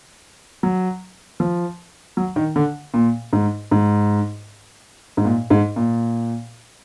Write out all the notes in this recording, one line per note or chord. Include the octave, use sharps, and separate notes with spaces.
F#3
F3
F#3
D#3
D3
A#2
G#2
G#2
G#2
A#2
G#2
A#2